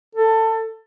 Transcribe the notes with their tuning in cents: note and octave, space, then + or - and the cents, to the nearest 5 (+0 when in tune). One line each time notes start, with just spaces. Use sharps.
A4 +20